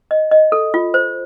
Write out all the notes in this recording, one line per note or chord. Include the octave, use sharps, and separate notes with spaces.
D#5
D#5
A4
F4
C5